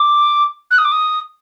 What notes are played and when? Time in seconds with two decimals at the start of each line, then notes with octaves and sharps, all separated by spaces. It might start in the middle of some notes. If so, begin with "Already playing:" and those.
Already playing: D6
0.71 F#6
0.78 D#6
0.84 D6
0.92 D#6